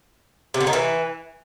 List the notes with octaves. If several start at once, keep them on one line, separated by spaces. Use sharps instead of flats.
C3
D3
D#3
E3